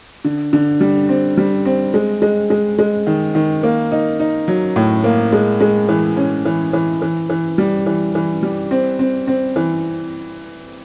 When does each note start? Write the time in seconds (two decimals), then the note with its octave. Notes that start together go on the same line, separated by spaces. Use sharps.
0.25 D3
0.53 D3
0.81 G3
1.09 C4
1.37 G3
1.65 C4
1.94 G#3
2.22 G#3
2.50 G#3
2.79 G#3
3.07 D#3
3.35 D#3
3.63 A#3
3.92 D#4
4.20 D#4
4.48 F#3
4.76 A2
5.04 A#3
5.33 G#3
5.61 G#3
5.88 E3
6.16 C#4
6.45 E3
6.73 E3
7.02 E3
7.30 E3
7.58 G3
7.86 E3
8.15 E3
8.43 G3
8.71 C4
8.99 C4
9.27 C4
9.56 E3